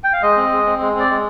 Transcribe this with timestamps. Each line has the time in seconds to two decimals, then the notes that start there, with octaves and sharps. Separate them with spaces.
0.04 G5
0.13 F5
0.22 G#3 D#5
0.36 C4
0.52 G#3
0.66 C4
0.80 G#3
0.95 C4 D5
1.10 G#3